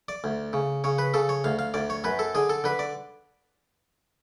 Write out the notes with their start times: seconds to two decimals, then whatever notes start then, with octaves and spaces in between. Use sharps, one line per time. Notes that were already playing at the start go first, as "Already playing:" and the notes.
0.09 D5
0.24 D2
0.53 C#3
0.84 C#3 C#5
0.98 B4
1.14 C#3 A4
1.29 C#5
1.44 D2 F5
1.59 F5
1.74 D2 D5
1.90 C#5
2.04 F#2 B4
2.19 A4
2.35 D3 G#4
2.50 A4
2.64 D3 B4
2.79 D5